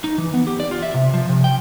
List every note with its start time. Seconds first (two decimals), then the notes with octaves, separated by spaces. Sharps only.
0.04 D#4
0.18 E3
0.34 B3
0.47 G4
0.60 D5
0.71 F4
0.82 E5
0.94 C3
1.14 F3
1.29 C3
1.44 G5